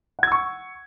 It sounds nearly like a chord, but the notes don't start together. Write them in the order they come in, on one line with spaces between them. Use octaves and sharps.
F#5 G#6 E6 C#6